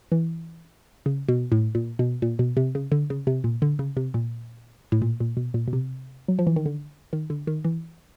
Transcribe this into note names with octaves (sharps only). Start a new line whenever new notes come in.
E3
C#3
B2
A2
A#2
B2
A#2
B2
C3
C#3
D3
C#3
C3
A#2
D3
C#3
C3
A#2
A2
A#2
A#2
B2
A#2
B2
C3
F#3
F3
E3
D#3
D3
D#3
D3
D#3
E3